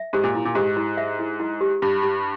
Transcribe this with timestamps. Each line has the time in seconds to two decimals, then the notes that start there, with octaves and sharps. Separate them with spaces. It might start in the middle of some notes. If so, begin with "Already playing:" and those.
Already playing: E5
0.13 G#2 G4
0.24 A#2
0.35 E4
0.45 A#2
0.55 G#2 G4
0.77 E4
0.97 E5
1.19 E4
1.40 E4
1.61 G4
1.82 G2 G4
2.03 G4